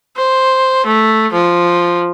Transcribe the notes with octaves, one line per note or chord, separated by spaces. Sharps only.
C5
A3
F3